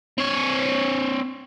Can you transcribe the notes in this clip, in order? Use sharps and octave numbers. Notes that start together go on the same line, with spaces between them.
C4 C#5